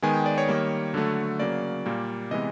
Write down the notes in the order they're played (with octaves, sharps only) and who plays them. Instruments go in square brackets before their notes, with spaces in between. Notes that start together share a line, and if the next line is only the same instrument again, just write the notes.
[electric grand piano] D#3 G#3 B3 G#5
G5
D5
C#5
D#3 G3 A#3
D3 F#3 A3
C#3 F#3 A#3 D5
A#2 G3 A#3
C3 E3 G#3 B3 D#5